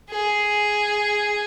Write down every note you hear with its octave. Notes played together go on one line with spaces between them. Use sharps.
G#4